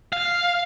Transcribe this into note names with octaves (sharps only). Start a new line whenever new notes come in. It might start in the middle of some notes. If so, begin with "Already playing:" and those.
F5